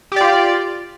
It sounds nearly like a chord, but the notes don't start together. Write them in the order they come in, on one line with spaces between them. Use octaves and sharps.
G4 D5 F4